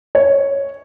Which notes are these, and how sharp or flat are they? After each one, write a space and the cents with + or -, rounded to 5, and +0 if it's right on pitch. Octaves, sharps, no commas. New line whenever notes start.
C#5 +0